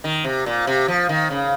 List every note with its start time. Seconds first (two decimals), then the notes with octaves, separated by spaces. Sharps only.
0.04 D#3
0.24 C3
0.46 A#2
0.67 C3
0.88 F3
1.09 D#3
1.30 C#3